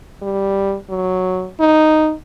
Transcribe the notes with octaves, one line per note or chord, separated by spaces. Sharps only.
G3
F#3
D#4